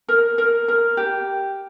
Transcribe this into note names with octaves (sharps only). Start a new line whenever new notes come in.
A#4
A#4
A#4
G4